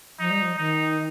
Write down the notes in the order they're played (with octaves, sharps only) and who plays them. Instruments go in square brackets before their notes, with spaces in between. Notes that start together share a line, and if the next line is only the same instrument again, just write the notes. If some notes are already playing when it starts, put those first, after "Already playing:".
[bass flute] F3 [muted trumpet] D#4
[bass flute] G3
F3
[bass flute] D#3 [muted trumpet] D#4